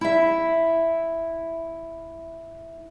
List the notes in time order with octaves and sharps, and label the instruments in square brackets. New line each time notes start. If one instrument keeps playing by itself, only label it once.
[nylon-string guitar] E4 E5